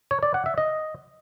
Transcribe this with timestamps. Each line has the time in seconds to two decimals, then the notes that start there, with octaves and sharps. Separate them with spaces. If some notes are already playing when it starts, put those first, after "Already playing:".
0.11 C#5
0.23 D5
0.34 F#5
0.46 E5
0.58 D#5